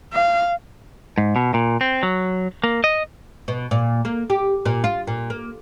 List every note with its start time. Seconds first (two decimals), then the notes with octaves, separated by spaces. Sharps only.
0.13 F5
1.18 G#2
1.36 B2
1.54 A#2
1.81 C4
2.03 F#3
2.64 A#3
2.84 D#5
3.48 B2
3.71 A#2
4.05 A#3
4.30 G4
4.65 A#2
4.84 F4
5.07 A#2
5.30 A#3